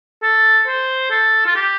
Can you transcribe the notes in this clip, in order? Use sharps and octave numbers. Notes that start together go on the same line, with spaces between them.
A4
C5
A4
F4
G4